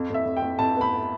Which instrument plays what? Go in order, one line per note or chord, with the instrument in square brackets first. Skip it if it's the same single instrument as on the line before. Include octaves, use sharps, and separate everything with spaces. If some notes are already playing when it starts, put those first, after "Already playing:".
Already playing: [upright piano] F2
F2 E5
F2
G5
F2
F2 A5
B3 B5